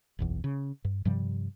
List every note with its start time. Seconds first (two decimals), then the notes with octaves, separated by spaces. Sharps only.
0.19 F#1 B1 E2
0.44 C#3
0.85 G2
1.05 G2 C3 F3 G3